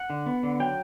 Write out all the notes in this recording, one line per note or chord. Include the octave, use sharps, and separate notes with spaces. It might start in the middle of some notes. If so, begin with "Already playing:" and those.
Already playing: F#5
D3
B3
D3
F#3 G5